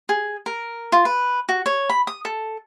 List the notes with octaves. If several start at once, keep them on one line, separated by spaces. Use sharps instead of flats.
G#4
A#4
F4
B4
F#4
C#5
B5
D#6
A4